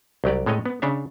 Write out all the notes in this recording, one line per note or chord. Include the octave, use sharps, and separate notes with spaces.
C2 F#3 G4 D5
A2 G#3 A3 C#5 D#5
B3
C#3 D4 C#5 E5